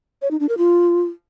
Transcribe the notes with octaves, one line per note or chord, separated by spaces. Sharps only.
C#5
D#4
D4
A#4
F4